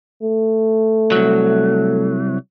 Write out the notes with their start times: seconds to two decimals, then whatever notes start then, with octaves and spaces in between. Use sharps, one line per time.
0.22 A3
1.12 C2 F#3